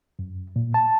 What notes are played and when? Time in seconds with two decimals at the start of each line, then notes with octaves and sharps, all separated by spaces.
0.19 F#2
0.56 A#2
0.74 A5